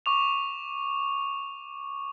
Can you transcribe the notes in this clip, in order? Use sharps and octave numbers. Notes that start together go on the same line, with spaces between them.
C#6 D6 F7